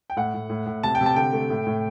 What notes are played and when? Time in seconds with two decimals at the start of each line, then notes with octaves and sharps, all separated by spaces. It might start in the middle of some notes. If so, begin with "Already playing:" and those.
0.10 G5
0.17 A2 F#5
0.34 A2
0.50 A2
0.67 A2
0.83 C3 A5
0.95 G5
1.01 C3
1.06 A5
1.16 D3 G5
1.33 A3
1.50 A2
1.67 A2